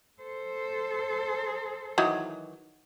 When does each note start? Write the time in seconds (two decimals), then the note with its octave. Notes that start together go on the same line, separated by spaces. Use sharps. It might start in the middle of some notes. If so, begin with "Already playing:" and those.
0.22 A4 C5
1.98 D#3 E3 F#3